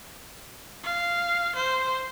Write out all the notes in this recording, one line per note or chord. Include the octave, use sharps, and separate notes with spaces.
F5
C5